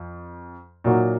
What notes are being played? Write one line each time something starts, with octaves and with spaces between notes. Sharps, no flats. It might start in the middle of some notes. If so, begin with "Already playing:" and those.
Already playing: F2
A#2 F#3 A#3 D#4 F#4